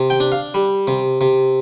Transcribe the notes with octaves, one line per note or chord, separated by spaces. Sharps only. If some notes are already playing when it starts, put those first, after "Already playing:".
Already playing: C3
G5
D4
F5
G3
C3
C3